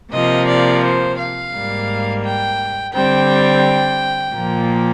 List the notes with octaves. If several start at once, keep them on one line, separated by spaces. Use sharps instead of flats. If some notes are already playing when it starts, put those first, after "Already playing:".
C3 F3 A#3 D#5
D5
C5
F5
G#2 G3 A#3
G5
D3 G3 C4 G5
A#2 F3 A#3